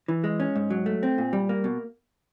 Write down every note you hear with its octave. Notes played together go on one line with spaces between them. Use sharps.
E3
G#3
C#4
G#2
F#3
A3
C4
A#2
G3
A#3
B2